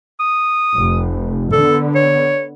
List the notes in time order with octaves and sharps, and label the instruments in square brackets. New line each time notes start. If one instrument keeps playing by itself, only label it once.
[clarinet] D#6
[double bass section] F1
[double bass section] D3 B3 [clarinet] A4
[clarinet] C#5